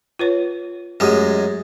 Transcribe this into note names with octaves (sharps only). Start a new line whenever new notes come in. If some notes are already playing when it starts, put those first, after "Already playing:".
F4 B4 C#5
F#2 G#3 A3 G4